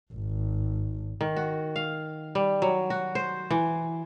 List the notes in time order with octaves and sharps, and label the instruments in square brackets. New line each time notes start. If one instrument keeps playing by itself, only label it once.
[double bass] G#1
[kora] D#3
F#4
F5
G3
F#3
F#4
C5
E3